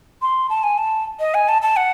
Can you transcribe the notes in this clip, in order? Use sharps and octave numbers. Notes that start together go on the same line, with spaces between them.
C6
A5
G#5
A5
D#5
G#5
A5
A5
F#5